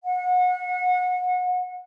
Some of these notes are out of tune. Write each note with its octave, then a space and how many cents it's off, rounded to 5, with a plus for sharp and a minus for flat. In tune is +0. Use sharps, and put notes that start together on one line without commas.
F#5 -30